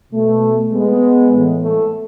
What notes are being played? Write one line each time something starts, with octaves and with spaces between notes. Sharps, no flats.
B2 A3
G#3 B3
A2 E3
A3